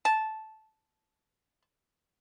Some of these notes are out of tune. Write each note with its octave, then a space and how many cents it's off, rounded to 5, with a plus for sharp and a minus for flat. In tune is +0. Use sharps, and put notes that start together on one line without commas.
A5 -10